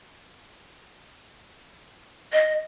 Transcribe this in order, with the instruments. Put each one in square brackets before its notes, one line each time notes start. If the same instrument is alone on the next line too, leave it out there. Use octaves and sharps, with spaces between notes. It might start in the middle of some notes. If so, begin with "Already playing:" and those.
[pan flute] D#5